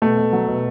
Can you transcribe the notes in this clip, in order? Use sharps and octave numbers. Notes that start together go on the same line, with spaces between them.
B2 A3
B2
F#3
B2